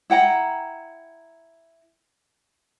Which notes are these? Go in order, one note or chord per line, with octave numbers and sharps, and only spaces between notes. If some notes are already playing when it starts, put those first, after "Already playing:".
E4 F#5 G5 A#5